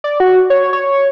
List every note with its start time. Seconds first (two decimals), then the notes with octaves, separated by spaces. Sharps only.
0.04 D5
0.20 F#4
0.50 C#5
0.73 C#5